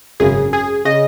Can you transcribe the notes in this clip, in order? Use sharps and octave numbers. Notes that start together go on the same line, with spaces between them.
G#1 F#2 C#3 G#4
G#4
C#3 D#5